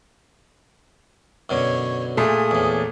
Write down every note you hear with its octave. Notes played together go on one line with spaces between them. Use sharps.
F#2 B2 D3 C#5
A#2 A3 G#4 D#6
E2 A2